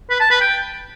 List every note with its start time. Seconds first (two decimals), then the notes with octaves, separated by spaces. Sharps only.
0.10 B4
0.20 A5
0.30 B4
0.41 G5